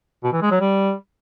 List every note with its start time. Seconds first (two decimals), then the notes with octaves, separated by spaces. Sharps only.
0.24 B2
0.33 E3
0.42 G#3
0.51 F#3
0.60 G3